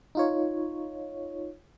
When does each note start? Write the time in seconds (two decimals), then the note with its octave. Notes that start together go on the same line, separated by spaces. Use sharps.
0.15 D#4 F4 C#5